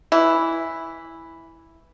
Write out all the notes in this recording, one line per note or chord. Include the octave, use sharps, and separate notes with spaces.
E3 E4